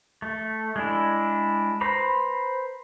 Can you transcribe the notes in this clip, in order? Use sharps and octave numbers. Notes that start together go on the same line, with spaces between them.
A3
G#3 D4 E4
B4 C5 A#5 B5